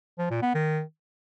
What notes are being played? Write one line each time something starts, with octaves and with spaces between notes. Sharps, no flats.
F3
A#2
B3
D#3